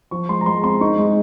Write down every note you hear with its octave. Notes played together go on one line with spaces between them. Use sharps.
F3 C#6
G#3 C6
A#5
G#3 C6
C4 C6
D#4 C#6
G#3